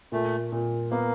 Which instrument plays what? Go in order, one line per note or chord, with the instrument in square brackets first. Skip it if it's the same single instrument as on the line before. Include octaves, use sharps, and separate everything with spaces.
[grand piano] A#2 [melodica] A3
[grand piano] A#2
[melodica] A#3 [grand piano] B3